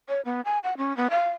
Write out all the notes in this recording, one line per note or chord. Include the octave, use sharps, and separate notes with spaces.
C#5
B3
G#5
F#5
C#4
B3
F5